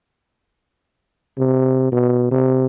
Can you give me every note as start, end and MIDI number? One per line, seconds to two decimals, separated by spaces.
1.38 1.91 48
1.92 2.30 47
2.31 2.67 48